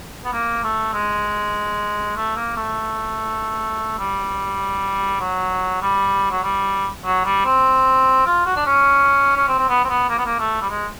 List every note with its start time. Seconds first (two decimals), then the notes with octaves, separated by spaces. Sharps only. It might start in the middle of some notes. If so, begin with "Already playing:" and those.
0.25 B3
0.33 A#3
0.64 A3
0.93 G#3
2.17 A3
2.36 A#3
2.56 A3
3.98 G3
5.20 F#3
5.82 G3
6.31 F#3
6.44 G3
7.05 F#3
7.25 G3
7.45 C4
8.26 F4
8.46 F#4
8.56 D4
8.66 C#4
9.36 C#4
9.48 C4
9.59 C4
9.69 B3
9.84 C4
9.89 B3
10.09 A#3
10.18 B3
10.26 A#3
10.39 A3
10.62 G3
10.70 G#3